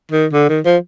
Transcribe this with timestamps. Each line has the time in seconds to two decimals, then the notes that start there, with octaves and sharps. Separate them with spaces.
0.11 D#3
0.33 D3
0.49 D#3
0.65 F3